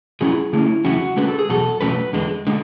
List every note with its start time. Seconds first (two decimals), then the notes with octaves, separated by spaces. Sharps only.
0.21 D3 F#3 C#4 E4 G#4
0.53 D3 A3 C#4 E4
0.84 E2 C#3 F#3 C#4 E4 F#4
1.17 D3 G#3 C#4 B4
1.28 A4
1.39 G#4
1.49 E2 B2 F#3 A4
1.81 E2 B2 F#3 A3 C#4 B4
2.13 E2 D3 G#3
2.47 D3 G#3